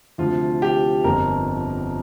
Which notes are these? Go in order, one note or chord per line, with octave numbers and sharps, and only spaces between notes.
D2 C3 F3 F4
G4
G1 F2 F3 A#3 A#4